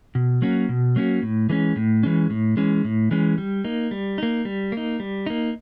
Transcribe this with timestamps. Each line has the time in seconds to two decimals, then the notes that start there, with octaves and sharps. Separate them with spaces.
0.15 B2
0.42 F#3 A#3 C#4 F#4
0.69 B2
0.96 F#3 A#3 C#4 F#4
1.22 A2
1.49 E3 G#3 C#4
1.76 A2
2.03 E3 G#3 C#4
2.30 A2
2.57 E3 G#3 C#4
2.85 A2
3.11 E3 G#3 C#4
3.38 G3
3.64 A#3 D#4
3.91 G3
4.18 A#3 D#4
4.45 G3
4.72 A#3 D#4
5.00 G3
5.26 A#3 D#4